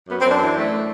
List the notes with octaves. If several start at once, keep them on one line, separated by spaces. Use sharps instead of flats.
F#2 B3
C4
F#2
D4
E3
A3